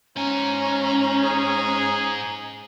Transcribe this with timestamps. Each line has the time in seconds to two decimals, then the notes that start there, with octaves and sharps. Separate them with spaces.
0.16 G#2 C#4 G#5 A#5
1.24 G#4